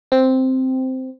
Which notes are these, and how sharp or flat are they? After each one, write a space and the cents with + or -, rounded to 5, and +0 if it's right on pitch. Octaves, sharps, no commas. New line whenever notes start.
C4 -5